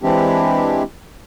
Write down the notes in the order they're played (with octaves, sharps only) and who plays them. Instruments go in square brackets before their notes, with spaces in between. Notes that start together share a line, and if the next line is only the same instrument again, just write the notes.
[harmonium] E3 G#3 C4 D4 E4 G4